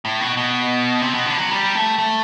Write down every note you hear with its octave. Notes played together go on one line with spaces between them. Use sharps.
A2
B2
B2
C3
B2
D3
F#3
G3
A3
A3